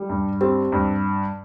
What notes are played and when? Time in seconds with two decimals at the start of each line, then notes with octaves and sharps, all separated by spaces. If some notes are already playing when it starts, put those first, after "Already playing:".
Already playing: G3
0.09 G2
0.41 C4 G4
0.72 G2